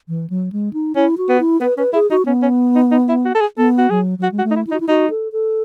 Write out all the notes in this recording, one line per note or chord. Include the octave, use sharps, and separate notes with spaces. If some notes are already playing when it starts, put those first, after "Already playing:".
E3
F#3
G#3
D#4
C#4 E4
F#4
B3
E4
B3 B4
C#4 B4
E4 G#4
D#4 F#4
B3 C#4
C#4
D#4
D#4
E4
F#4
A4
G#4
B3 A4
F#4
F#3 G#4
F#3 F#4
G#3
F#4
A3
D#4
E4
E4
D#4 F#4
E4
D#4 F#4
A4
A4